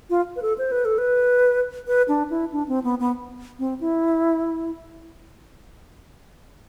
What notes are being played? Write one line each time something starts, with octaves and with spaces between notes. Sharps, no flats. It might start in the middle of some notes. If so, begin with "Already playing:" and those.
F4
B4
A4
C5
B4
A4
B4
B4
D4
E4
D4
C4
B3
B3
C4
E4